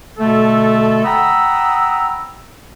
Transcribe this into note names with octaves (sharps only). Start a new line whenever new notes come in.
B2 D3 A3 A4
F#5 G5 A#5 B5 D#6 E6